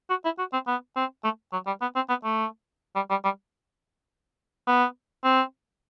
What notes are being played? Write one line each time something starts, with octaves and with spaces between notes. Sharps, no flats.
F#4
E4
F#4
C4
B3
C4
A3
F#3
G3
B3
C4
B3
A3
G3
G3
G3
B3
C4